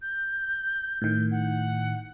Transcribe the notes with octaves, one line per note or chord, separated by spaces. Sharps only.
G6
A2 D#3
F#5